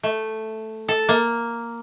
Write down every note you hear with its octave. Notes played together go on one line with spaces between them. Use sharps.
A3
A4
A#3